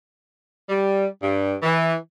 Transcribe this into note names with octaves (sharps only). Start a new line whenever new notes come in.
G3
G2
E3